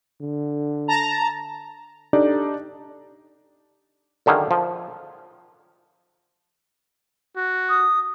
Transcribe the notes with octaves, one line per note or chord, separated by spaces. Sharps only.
D3
A5 A#5
D4 D#4 G4 A4 D5
F#2 D3 D#3 G#4 F5
F3
F#4
D#6